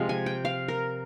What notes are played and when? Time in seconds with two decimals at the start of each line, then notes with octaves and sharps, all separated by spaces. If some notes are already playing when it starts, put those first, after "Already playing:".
Already playing: C3 F3 G#3 F5
0.09 G#5
0.26 G5
0.45 F5
0.68 A#4